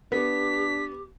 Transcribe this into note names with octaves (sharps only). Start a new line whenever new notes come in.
B3 D4 G4 B6